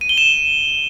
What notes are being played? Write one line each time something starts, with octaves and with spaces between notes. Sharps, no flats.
D#7
G7
E7